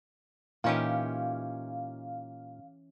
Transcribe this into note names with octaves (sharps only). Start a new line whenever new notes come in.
A#2 E3 C#4 D#4 G4 F5